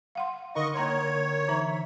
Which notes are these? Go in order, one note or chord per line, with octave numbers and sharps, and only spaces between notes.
F5 F#5 C6
D3 D#4 A#4 D#5 C#6
A#3 C#5 A#5 C6
E3 D#4 E5 A#5